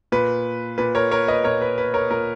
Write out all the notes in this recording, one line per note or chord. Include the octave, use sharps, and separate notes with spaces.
A#2 B4
A#2 B4
A#4 C#5
A#4 C#5
B4 D#5
A#2 A#4 C#5
B4
B4
A#4 C#5
A#2 A#4